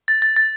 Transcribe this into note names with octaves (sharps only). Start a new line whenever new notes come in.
A6
A6
A6